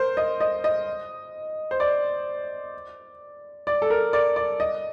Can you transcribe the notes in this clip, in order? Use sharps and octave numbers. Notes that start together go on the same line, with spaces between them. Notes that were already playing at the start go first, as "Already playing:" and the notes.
Already playing: A#4 C5
D#5
D#5
D#5
C5
D5
D5
A4
A#4
D5
D5
D#5